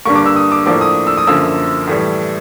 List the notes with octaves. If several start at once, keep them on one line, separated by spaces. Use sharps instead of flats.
G2 D3 G3 A#3 C#6
D6
E6
D#6
D6
A2 F3 A#3 D4 D6
D#6
E6
D#6
F#2 D3 F3 A#3 E6
A2 E3 G3